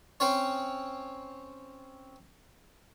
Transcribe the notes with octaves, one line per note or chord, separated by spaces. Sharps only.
C4 C#4 C#5